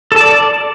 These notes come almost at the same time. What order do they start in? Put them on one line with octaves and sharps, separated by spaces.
A4 A5 D5